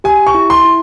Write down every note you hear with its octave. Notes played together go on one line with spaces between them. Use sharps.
G4 G#5
C#6
E4
C6
E4